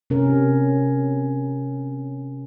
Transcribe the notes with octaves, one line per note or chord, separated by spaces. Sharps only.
C3 C#4 A#4